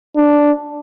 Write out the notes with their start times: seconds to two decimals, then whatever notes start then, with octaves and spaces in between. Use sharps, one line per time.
0.16 D4